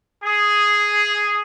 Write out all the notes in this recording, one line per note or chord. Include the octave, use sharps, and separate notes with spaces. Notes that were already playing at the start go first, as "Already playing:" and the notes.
G#4